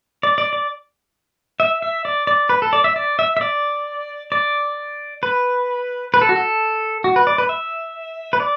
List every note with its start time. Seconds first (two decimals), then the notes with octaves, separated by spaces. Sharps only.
0.23 D5
0.38 D5
0.53 D5
1.60 E5
1.82 E5
2.05 D5
2.27 D5
2.49 B4
2.62 A4
2.73 D5
2.84 E5
2.96 D5
3.19 E5
3.37 E5
3.41 D5
4.32 D5
5.23 B4
6.14 B4
6.22 A4
6.29 F#4
6.36 A4
7.04 F#4
7.16 B4
7.27 D5
7.38 B4
7.49 E5
8.33 B4
8.40 D5